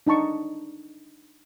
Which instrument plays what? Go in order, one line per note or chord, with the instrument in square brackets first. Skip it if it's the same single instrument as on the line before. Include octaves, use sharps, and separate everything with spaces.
[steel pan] D4 D#4 A5 C#6